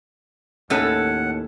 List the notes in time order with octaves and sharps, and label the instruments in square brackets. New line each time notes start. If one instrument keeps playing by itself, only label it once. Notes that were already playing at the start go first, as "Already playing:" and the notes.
[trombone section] D#2 [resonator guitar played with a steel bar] A2 C#4 A4 [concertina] F#5